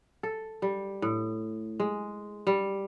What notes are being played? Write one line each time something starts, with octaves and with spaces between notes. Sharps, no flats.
A4
G3
A2
G#3
G3